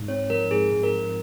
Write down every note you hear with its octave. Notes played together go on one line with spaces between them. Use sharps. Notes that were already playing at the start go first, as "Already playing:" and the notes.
Already playing: G#2
C4 C#5
F3 A#4
G#2 G#4
G#2
A#4
F3